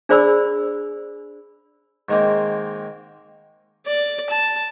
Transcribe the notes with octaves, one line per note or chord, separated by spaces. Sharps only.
D4 G#4 C5 D5 B5 E6
G#2 D#3 G#3 A#3 C4
D5
A5